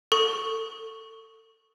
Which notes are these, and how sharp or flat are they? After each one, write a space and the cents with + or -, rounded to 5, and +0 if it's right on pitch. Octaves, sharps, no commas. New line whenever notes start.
A4 +25 C#6 +0